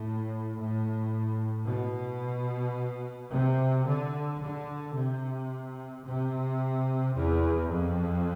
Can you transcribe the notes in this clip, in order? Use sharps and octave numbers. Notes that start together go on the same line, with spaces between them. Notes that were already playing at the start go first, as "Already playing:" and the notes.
Already playing: A2
A2
B2
C3
D3
D3
C3
C3
E2
F2